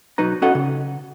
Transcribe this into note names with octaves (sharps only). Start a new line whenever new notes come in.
B1 F#3 D#4 B4 A#5
C#4 F#4 A4 D#5 F5 F#5
C#3